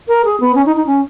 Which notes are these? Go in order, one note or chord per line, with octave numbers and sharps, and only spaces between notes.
A#4
G#4
B3
C#4
D#4
D#4
C#4